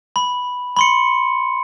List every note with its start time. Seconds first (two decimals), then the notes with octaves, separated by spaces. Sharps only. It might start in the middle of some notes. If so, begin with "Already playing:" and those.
0.16 B5
0.77 B5 C6 C#7